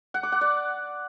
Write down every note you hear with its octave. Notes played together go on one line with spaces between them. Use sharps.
F#5
D6
F#5
D5